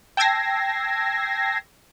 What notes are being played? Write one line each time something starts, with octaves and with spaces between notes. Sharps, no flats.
G5 A5 E6 G#6 A#6 C7